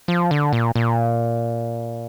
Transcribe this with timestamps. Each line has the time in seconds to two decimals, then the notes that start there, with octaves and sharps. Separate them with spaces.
0.08 F3
0.31 D3
0.53 A#2
0.75 A#2